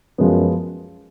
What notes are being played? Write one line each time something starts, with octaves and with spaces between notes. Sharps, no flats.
F#2 F3 G#3 B3